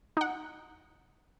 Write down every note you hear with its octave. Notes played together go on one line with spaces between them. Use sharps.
D#4 F#5